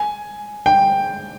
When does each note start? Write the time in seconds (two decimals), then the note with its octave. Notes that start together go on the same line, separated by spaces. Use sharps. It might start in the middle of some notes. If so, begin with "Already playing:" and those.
Already playing: G#5
0.66 G5